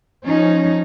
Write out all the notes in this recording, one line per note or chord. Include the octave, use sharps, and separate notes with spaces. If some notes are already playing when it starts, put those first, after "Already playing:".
F3 C#4 D#4